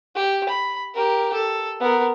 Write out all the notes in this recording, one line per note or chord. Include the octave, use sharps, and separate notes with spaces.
G4
B5
G4 A#4
A4
B3 A#4